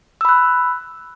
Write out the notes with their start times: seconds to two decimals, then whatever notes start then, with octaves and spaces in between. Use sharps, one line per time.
0.21 E6
0.25 B5
0.29 F#6